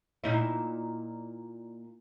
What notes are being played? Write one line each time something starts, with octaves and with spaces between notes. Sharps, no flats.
A#2 D#4 E4